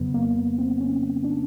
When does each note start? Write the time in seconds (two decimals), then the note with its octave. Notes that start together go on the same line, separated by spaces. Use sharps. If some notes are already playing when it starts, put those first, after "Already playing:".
Already playing: F2 C#3 F#3 B3
0.14 A#3
0.36 B3
0.58 C4
0.80 C#4
1.24 D4